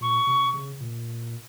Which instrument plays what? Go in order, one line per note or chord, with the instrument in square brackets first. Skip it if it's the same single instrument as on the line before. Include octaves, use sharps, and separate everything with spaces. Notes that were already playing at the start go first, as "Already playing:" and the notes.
[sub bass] A#2 [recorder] C#6
[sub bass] C3
C#3
A#2